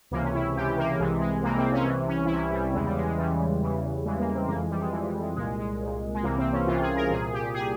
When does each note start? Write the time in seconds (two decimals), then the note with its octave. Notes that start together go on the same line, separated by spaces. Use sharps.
0.11 C#2 C3 E3 A#3
0.23 C#4
0.34 E4
0.56 C#2 C3 E3 G4
0.78 A#3
0.99 C2 C3 E3 G#3
1.21 G#3
1.43 C2 C3 E3 A#3
1.57 C4
1.73 C#4
1.86 C2 C3 E3
2.08 C#4
2.25 E4
2.30 C2 C3 E3 C#4
2.53 G3
2.74 E2 C#3 E3 G#3
2.85 G3
2.96 G#3
3.06 G#3
3.17 E2 C#3 E3 G3
3.61 E2 C#3 E3
4.05 E2 C#3 E3 G#3
4.19 A#3
4.34 C4
4.48 F2 E3 A#3
4.59 G#3
4.70 G3
4.81 G#3
4.93 F2 E3
5.07 G3
5.21 G#3
5.36 C2 A#2 G#3
5.58 G#3
5.79 C2 A#2
6.15 G#3
6.23 C2 C3 E3 A#3
6.38 C4
6.52 C#4
6.67 C2 C3 E3 F4
6.81 G#4
6.96 A#4
7.11 C2 A#2 G#4
7.33 G4
7.54 A#2 G#4